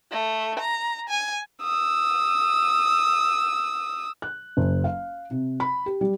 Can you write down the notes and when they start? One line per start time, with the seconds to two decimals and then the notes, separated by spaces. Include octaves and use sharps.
0.11 A3
0.59 A#5
1.09 G#5
1.62 D#6 E6
4.22 F#6
4.57 F#1
4.84 F5
5.31 C3
5.60 B5
5.86 G4
6.01 G3